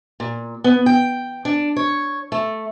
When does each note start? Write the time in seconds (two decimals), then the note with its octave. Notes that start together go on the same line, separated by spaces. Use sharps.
0.20 A#2
0.64 B3
0.86 G5
1.45 D4
1.76 C#5
2.32 A3